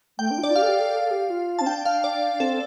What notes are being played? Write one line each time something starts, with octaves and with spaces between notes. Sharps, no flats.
A3 G5
D4
F4
D4 D5
F4
G4 F5
A4
G4
A4
A4
A4
G4
F4
C4 A5
D4 G5
F5
D5
C4 A4